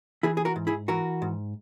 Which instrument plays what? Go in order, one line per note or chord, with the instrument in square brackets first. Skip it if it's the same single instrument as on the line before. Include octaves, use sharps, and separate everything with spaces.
[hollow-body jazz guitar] E3 E4 G#4
G#4
F#4 A#4
G#2
E4 G#4
E3 F#4 A#4
G#2